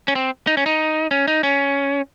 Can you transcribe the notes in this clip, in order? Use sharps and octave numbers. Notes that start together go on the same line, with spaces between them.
C#4
C4
D#4
C#4
D#4
C#4
D#4
C#4